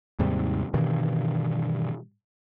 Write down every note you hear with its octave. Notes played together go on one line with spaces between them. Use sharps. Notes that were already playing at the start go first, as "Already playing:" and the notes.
D#2 G#2 C3 G3
G2 B2 D#3 E3